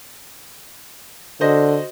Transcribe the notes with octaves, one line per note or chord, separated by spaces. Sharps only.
D3 F#4 C5 D#5